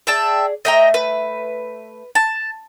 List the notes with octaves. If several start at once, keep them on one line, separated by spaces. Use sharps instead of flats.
G#4 D5 E5 G5 A5
A3 C#5 D#5 E5 G5 A#5
B4
A5